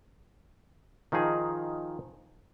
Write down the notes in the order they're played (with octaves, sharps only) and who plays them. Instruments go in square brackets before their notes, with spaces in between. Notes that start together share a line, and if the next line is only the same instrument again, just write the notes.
[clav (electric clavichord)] D#3 F3 D#4 G#4